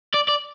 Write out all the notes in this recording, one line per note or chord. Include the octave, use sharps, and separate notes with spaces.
D5
D5